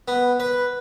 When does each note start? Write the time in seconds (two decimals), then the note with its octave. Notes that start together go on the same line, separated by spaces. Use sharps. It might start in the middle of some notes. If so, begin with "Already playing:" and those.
0.08 B3
0.40 B4